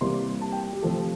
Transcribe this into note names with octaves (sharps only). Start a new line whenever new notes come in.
C3 E3 G3 A#3 C6
A5
G5
G4
C3 F3 A3 A4